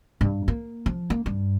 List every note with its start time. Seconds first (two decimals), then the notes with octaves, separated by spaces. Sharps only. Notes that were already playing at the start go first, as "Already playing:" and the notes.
0.21 G2
0.48 A#3
0.86 F3
1.10 A#3
1.26 G2